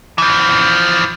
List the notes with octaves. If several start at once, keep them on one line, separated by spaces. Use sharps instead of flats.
E3 F3